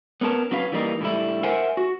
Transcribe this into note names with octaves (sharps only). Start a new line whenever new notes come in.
B3 C#4 A#4 B4 A5
F#3 C#4 B4 F5
E3 G3 A#3 D#4
A2 D3 G3 E4
A#4 C5 E5 F#5 G#5
F#4